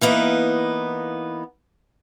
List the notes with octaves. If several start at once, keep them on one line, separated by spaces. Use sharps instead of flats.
E3 A#3 B3 D#4